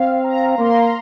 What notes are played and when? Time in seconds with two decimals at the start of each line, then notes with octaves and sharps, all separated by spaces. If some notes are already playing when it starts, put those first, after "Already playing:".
Already playing: C4 F5
0.24 A#5
0.58 A#3 C6
0.75 A#5